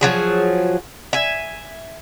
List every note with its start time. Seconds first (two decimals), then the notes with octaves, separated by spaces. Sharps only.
0.01 F3 F#3 G#4
1.13 E5 G#5